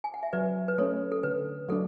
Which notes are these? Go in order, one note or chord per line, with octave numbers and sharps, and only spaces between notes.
G#5
F#5
E5
F#3 B4 D5
B4
A3 C#4 A4 C#5
A4
D3 B4
F#3 A3 D4 A4